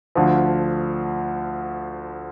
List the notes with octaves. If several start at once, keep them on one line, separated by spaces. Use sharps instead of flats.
D2 D3 F3